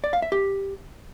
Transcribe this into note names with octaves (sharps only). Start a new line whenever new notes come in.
D5
F5
E5
G4